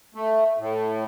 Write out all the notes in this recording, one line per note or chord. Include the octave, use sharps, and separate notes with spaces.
A3
A2